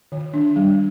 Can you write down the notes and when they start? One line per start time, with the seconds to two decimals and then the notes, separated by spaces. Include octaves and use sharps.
0.12 D#3
0.34 D4
0.56 G3